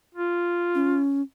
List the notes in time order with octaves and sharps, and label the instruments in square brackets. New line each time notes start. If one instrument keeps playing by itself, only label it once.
[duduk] F4
[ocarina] C#4